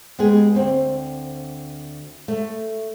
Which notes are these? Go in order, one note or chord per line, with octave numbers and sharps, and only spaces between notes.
G#3 B3 G4 G#4
D2 C4
A3